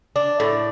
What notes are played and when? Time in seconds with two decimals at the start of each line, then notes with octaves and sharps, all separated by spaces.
0.16 D4
0.40 A2